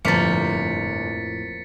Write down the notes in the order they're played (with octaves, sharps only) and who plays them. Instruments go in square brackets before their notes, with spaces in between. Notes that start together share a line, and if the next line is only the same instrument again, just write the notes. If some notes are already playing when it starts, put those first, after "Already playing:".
[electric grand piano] G1 [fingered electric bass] F2 A2 [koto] F3 A#3 [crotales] A6 B6 C#7